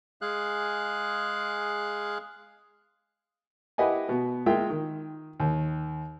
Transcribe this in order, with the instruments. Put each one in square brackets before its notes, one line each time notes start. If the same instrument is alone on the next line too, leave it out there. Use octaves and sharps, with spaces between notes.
[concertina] G#3 G#4 F5 F#6
[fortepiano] E4 G4 B4 D#5 F#5 G#5
B2 B3
G#3 A#3 F4 E5 G5
D#3
D#2